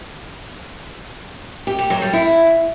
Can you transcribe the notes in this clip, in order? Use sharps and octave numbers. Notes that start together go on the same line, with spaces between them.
G4
G4
F#3
G3
E4